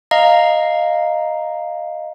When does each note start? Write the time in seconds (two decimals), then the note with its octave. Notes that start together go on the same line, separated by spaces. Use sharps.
0.11 D#5 F5 A#5